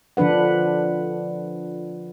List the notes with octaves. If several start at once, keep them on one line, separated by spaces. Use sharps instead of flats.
D3 F3 D4 B4 F#5